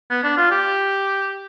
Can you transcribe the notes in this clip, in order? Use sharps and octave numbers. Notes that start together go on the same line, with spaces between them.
B3
D4
F4
G4